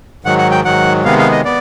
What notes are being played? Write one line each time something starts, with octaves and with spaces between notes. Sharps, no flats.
G#2 D#3 F#3 F#5
F#5
G5
G#2 D#3 F#3 F#5
C3 D#3 G#3 B3 F5
F5
D#5
B3 D5